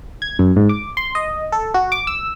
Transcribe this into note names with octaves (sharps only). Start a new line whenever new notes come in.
G#6
F#2
G#2
D6
C6
D#5
A4
F#4
D6
E6